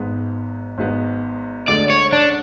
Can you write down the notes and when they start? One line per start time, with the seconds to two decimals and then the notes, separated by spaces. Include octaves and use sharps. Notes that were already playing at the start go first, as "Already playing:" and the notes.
Already playing: G#1 G#2 G#3 B3
0.78 G#1 G#2 G#3 B3
1.68 D2 D3 G#3 D5
1.90 C#5
2.12 D4